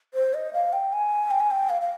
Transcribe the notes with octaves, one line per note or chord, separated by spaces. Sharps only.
C5
D#5
F5
G5
G#5
G5
G#5
G5
F5
F5